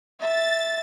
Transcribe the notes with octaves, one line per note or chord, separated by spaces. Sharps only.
E5 A6